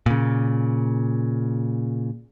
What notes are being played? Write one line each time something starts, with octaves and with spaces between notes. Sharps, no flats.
A#2 C#3